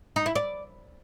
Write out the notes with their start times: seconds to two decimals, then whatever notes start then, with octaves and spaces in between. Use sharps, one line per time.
0.16 D#4
0.26 E4
0.35 D5